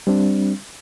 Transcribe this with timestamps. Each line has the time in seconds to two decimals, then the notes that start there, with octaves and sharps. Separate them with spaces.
0.07 G3 C4 D4